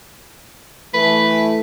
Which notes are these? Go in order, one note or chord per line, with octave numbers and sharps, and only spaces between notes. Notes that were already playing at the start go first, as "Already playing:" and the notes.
E3 A3 B4